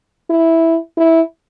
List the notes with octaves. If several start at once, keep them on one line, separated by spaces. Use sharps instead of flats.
E4
E4